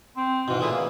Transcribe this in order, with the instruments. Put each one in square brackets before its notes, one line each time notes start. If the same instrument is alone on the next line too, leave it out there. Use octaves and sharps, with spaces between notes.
[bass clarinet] C4
[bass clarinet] G#2 [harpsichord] B2 E3
[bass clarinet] A#2 [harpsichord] A3 G#4 B4
[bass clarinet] A#3